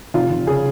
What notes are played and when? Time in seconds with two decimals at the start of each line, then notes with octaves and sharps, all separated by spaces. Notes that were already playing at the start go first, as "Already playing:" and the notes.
0.14 F1 F4
0.31 F1
0.47 C#3 G#4